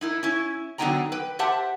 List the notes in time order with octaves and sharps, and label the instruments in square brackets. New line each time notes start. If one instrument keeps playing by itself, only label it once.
[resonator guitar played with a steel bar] D#4 E4 A#4
C#4 E4
D3 F#3 B3 D#4 G5 A#5
B4 G5
G4 C5 E5 F#5 A5